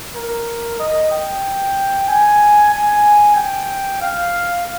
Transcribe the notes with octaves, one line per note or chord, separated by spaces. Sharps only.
A#4
D#5
G5
G#5
G#5
G5
F5